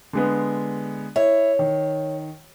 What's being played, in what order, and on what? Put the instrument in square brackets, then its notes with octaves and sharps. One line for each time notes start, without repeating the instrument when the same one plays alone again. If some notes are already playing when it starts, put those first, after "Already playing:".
[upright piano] D3 G#3 B3
[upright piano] E4 [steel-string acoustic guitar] C#5
[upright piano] D#3